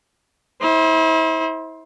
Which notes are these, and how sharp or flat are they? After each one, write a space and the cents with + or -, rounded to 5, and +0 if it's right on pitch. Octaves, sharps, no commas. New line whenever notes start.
E4 -35 C5 +15